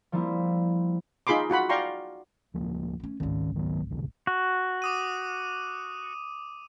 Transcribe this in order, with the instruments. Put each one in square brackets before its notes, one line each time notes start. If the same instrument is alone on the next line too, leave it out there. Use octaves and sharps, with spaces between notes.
[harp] F3 G3 A#3 C4 E4
[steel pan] D#4 F4 G#4 B5 C6 D6
F4 F#4 F#5 B5
D5 F5 G5 A#5 C6 C#6
[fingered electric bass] D1 F3 A#3
[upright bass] A3 C#4
[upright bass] G#1 C#2 [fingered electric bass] D#3 C#4
[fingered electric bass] D#3 F#3 B3
F1 C2 D3
[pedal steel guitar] F#4
[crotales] D6 D#6 D#7